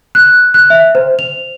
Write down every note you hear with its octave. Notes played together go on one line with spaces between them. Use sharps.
F#6
F#6
E5
C5
F7